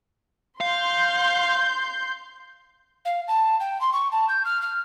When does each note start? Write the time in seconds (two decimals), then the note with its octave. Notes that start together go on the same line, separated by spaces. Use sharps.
0.61 F5 C6 G6
3.05 F5
3.28 A5
3.60 G5
3.81 C6
3.93 C#6
4.12 A5
4.28 G6
4.45 F6
4.62 F6